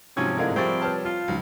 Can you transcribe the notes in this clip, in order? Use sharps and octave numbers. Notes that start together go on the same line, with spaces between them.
G#2 C3 F3 F#3 C#4 G#6
A2 D3 G#4 A#4 D#5 F5 G#6
F3 G3 C4 E5 C#6 A6
B4 C#5 A5 F6
F4 F5
C#2 F3 F#3 D#4